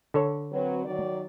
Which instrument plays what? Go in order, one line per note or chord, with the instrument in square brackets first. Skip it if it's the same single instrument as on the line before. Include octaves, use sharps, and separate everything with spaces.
[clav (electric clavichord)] D3 A4 C#5
[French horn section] F#3 C4 B4
D#3 F#3 D5